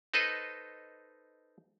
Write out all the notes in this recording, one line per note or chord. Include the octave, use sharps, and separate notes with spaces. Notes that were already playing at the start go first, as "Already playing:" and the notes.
D#4 A4 B4 C5 D#5